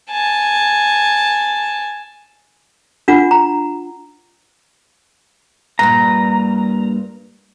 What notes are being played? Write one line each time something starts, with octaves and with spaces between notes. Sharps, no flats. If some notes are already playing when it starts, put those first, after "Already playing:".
G#5 A5
D4 F4 F#5
A#5
G2 A#2 A#5